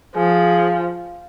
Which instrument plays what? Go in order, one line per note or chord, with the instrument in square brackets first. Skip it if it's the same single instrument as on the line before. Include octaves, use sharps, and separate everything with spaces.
[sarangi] F3 [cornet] G#4